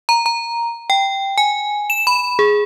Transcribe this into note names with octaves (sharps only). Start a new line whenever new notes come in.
A#5
A#5
G5
G#5
E7
B5
G#4